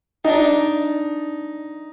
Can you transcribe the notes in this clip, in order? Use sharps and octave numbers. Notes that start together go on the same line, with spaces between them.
D4 D#4